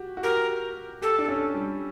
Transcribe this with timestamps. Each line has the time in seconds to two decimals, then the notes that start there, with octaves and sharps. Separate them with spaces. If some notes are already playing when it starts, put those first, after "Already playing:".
Already playing: F#4 G4
0.17 F#4
0.23 G4 A#4
1.02 G4 A4
1.19 D4
1.28 C#4
1.54 G3